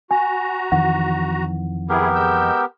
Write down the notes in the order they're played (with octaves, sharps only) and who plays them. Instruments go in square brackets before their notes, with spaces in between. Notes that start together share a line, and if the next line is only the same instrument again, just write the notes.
[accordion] F#4 A#5 [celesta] G#5
[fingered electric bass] F2 D#3 E3 [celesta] F#5
[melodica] B3 G4 A#4 [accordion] E4 G#4
[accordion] G#3 E6 G6